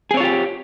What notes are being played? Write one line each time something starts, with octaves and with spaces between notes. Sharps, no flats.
C4 F4 G4 G#4 C#5